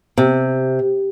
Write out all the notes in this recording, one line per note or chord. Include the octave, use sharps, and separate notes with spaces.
C3